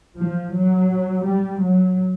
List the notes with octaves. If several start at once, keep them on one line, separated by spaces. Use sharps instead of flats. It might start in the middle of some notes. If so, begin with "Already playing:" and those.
F3
F#3
G3
F#3